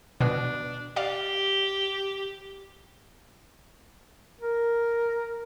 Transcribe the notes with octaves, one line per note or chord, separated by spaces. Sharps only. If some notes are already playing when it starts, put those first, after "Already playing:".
B2 D4
G4 D5 F5
A#4